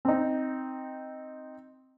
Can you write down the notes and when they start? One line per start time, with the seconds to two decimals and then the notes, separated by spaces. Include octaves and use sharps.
0.05 C4 D#4